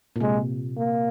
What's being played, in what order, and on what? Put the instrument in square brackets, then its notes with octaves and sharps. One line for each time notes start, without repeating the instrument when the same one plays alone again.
[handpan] A#2
[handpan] C3 [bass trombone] G#3
[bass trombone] A#3